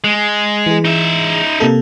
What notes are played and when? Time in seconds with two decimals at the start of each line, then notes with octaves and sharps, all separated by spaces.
0.04 G#3
0.66 E3 G#4
0.85 D#4 E5
1.60 C3 A#3 A4